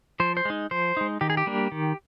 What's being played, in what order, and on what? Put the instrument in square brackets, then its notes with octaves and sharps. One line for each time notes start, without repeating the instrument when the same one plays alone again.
[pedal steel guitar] F3 C5
C5
G#3 D#4
F3 C5
G#3 D#4
D#3 G4
G#4
G4
G3 A#3 D4
D#3